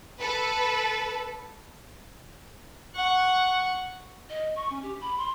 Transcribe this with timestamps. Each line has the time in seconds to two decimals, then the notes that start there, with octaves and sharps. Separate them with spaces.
0.20 A4 B4
2.95 F#5 C#6
4.29 D#5
4.55 C#6
4.69 C#4
4.82 G4
5.00 B5
5.17 C6